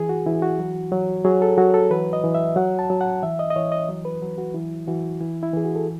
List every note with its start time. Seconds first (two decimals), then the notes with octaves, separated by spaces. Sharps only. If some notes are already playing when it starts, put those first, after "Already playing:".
Already playing: E3 G#4
0.09 F#4
0.26 E3 E4
0.42 F#4
0.59 F#3
0.92 F#3
1.25 F#3 G#4
1.42 A4
1.58 F#3 F#4
1.74 A4
1.90 E3 B4
2.13 D#5
2.24 E3
2.35 E5
2.56 F#3 F#5
2.79 A5
2.90 F#3
3.01 F#5
3.23 E3 E5
3.39 D#5
3.50 D#5
3.56 E3 C#5
3.72 D#5
3.89 F#3
4.05 B4
4.21 F#3
4.38 F#4
4.54 E3 E4
4.87 E3 F#4
5.21 E3 E4
5.43 E4
5.53 E3 G#4
5.65 F#4
5.76 A4